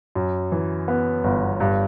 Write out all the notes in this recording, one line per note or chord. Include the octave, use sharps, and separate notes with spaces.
F#2
E3
B3
G1
G2